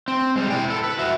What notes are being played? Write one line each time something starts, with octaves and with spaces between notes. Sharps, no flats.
C4
G3 G#3
E4 G5
B3 A4
B4
F#4 E5